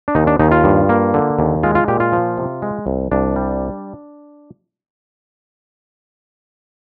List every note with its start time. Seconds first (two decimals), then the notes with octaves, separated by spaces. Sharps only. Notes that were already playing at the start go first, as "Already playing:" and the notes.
0.08 D4
0.15 D#2 D#4
0.27 D4
0.39 D#2 D#4
0.51 F4
0.64 G2
0.89 A#3
1.14 D3
1.39 D#2
1.63 G#3 F4
1.75 F4
1.88 A#2 G4
2.00 F4
2.12 F3
2.38 C3
2.62 G#3
2.87 C2
3.12 C2 D4
3.36 G3